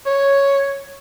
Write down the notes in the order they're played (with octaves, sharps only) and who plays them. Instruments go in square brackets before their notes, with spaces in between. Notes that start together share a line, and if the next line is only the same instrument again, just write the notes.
[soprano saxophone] C#5